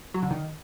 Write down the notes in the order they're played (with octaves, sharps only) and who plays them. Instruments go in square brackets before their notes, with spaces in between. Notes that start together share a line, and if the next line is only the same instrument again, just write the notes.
[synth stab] F#3
D3
D#3